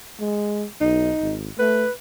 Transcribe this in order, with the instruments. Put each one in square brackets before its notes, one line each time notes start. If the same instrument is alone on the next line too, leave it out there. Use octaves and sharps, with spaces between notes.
[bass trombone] G#3
[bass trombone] B1 [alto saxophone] D#4
[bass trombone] G#1
[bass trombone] A3 [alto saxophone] B4